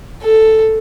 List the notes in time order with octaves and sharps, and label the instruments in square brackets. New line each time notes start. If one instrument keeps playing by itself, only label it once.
[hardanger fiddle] A4